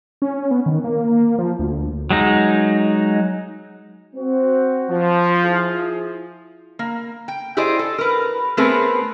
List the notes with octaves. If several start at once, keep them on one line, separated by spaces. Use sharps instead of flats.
C#4
B3
D#3
A#3
F3
D2
F#3 G#3 D#4
C4 F#4
F3
E4 F4 G#4
A#3
G5
E4 G4 G#4 C5 D5 D#5
A4
A#4 B4
A3 B3 C4 G#4 A#4 B4